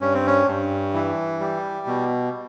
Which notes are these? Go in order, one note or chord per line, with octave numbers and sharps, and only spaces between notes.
G2 C#4
C4
C#4
G2
E3
G3
B2